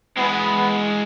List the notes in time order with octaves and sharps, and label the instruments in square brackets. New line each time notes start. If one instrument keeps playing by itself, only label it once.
[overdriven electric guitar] E3 G#3 [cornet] B3